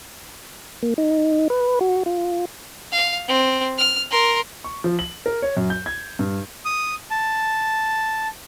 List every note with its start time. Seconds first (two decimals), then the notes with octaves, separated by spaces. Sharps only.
0.83 A#3
0.98 D#4
1.50 B4
1.81 F#4
2.06 F4
2.92 F5
3.28 C4
3.78 F6
4.11 A#4 C6
4.64 C#6
4.84 F3
4.99 F#7
5.26 A#4
5.42 C#5
5.57 F#2
5.70 G6
5.86 G#6
6.19 G2
6.65 D#6
7.11 A5